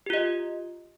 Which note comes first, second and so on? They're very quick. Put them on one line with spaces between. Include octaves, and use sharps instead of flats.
G4 F4 D#5